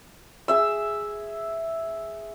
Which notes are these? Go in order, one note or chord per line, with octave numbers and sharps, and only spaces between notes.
G#4 E5 E6